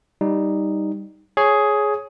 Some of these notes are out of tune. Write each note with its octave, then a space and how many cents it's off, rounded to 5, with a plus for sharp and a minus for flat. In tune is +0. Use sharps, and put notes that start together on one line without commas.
G3 +0 D#4 +0
G#4 +10 C#5 +0